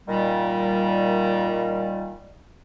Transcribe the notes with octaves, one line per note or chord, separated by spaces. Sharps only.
A#2 D#3 G3